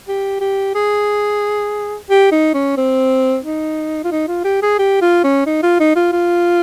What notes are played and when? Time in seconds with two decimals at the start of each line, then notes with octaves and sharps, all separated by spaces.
0.08 G4
0.41 G4
0.75 G#4
2.10 G4
2.32 D#4
2.54 C#4
2.77 C4
3.44 D#4
4.04 F4
4.12 D#4
4.28 F4
4.45 G4
4.62 G#4
4.79 G4
5.02 F4
5.24 C#4
5.46 D#4
5.63 F4
5.80 D#4
5.96 F4
6.13 F4